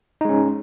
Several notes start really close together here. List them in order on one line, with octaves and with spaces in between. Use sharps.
D#4 G#3 C#4